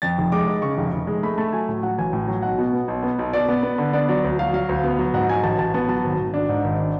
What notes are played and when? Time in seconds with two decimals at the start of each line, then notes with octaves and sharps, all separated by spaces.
0.02 F2 A6
0.18 F1
0.32 G#3 D6
0.47 G#3
0.62 C#3 C#6
0.77 F1
0.93 F1
1.07 G#3
1.23 A3 B5
1.38 A3 A5
1.53 F#3 G#5
1.68 A2
1.83 F#3 F#5
1.98 A1 G#5
2.13 A2
2.27 F#3
2.42 B1 F#5
2.58 B2
2.73 B3
2.88 B1
3.03 B3
3.19 B1
3.33 B2 D5
3.48 B3
3.63 B3
3.78 D3
3.93 B3 D5
4.09 F#3 D5
4.24 D2
4.39 F#3 F5
4.53 F#3 F5
4.69 D2
4.84 B3
4.99 F#3
5.14 G#2 F#5
5.29 F#3 G#5
5.43 A1 A5
5.58 A1 A5
5.74 B3 A5
5.89 F#3 A5
6.04 G#1
6.19 G#1
6.34 D4
6.49 G#2
6.64 G#1
6.79 D4